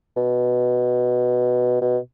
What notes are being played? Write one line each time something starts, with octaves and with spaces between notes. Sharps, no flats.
B2
B2